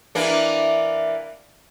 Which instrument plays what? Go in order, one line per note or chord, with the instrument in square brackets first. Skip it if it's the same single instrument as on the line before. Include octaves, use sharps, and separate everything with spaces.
[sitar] E3 A#3 D4